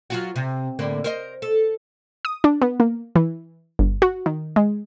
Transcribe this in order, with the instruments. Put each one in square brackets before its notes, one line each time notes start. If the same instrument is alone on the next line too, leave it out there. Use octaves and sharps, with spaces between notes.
[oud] F#3 F4 F#4
C3
A2 D3 A#3
A#4 C5 D#5
A4
[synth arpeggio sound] D#6
D4
B3
A#3
E3
G1
F#4
D#3
G#3